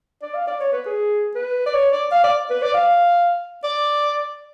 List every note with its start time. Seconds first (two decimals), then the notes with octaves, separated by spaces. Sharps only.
0.22 D5
0.35 F5
0.47 D5
0.60 C#5
0.72 B4
0.86 G#4
1.35 B4
1.66 D5
1.74 C#5
1.92 D5
2.11 F5
2.24 D5
2.50 B4
2.62 D5
2.74 F5
3.64 D5